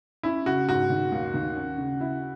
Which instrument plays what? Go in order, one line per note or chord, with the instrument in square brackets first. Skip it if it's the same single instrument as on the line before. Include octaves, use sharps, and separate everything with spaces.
[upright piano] C#4 [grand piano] E4
[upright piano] C#3 [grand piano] F#4
[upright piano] G#2 [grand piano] F#4
[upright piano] D#3
D#2
D#3
C#4
C#3
E4